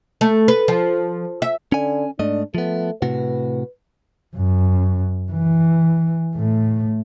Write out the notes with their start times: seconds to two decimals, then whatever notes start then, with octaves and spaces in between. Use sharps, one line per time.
0.21 A3
0.48 B4
0.68 F3
1.42 E5
1.72 D3 C#4 G#5
2.19 G#2 A3 D4 D#5
2.55 F3 A3 B3
3.02 A2 C3 F#4 B4
4.36 F#2
5.31 E3
6.36 A2 A3